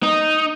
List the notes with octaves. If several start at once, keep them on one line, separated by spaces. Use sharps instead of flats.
D#4